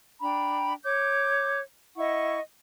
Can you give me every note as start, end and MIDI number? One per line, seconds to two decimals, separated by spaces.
0.20 0.74 62
0.20 0.74 79
0.20 0.74 82
0.20 0.74 83
0.83 1.59 73
0.83 1.59 86
0.83 1.59 91
1.97 2.40 64
1.97 2.40 75
1.97 2.40 78
1.97 2.40 85